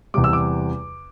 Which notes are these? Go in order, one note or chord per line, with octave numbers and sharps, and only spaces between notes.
E2 C3 G3 D6
E6
D6